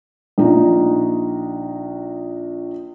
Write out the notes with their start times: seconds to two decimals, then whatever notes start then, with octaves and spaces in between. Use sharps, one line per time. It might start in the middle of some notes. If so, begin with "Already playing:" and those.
0.38 A#1 D#4